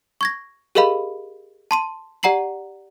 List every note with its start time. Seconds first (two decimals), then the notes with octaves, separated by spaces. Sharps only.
0.21 C#6 G#6 A#6
0.75 G4 G#4 A#4 D#5 F5 B5
1.71 A5 C6 D#7
2.23 G4 D5 F#5 A#5 C7 F#7